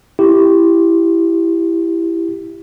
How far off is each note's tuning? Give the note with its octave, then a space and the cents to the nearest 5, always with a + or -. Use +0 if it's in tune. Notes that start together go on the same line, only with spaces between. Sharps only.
E4 +10 G4 +0